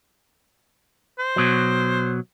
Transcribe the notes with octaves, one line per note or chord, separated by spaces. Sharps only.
C5
B2 F#3